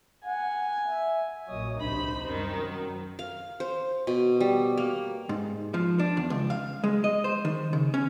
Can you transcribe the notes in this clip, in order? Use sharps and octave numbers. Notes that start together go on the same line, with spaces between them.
F#5 G#5
E5
A#1 A#2 F#3 C#5 D#5 D#6
C#2 C3 D4 D#4 C5 B5
F#2 D#3 G3 C#4
F#3
F5
C5
B2
G3
A#3
G#2
F3
D4
E2
C#2
F5
G#3
D#5
C5
D#3
C#3
C#4